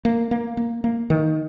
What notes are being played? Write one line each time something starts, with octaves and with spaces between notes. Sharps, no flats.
A#3
A#3
A#3
A#3
D#3